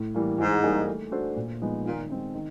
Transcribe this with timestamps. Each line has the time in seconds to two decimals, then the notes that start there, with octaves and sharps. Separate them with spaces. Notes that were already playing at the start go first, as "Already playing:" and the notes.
Already playing: A2
0.15 E3 G3 A#3
0.38 G#2 E3
0.63 G3 A#3 D#4 G#4
0.87 A3
1.11 D4 F#4 A4 C5
1.36 A#2
1.61 F3 G#3 B3 D#4
1.85 A#2 D#3
2.10 G#3 C4 D#4
2.35 D#3